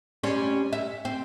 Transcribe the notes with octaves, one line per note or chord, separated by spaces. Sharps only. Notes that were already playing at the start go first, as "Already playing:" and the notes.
G3 C4 C#4
E5
C4